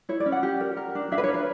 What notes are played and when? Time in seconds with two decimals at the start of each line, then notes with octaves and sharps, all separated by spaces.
0.09 E4 C#5
0.20 D5
0.26 C#4
0.32 F#5
0.43 G4
0.60 A#4
0.77 A#4
0.95 D4
1.12 D4 E5
1.18 B4
1.24 C#5
1.29 A#4
1.34 B4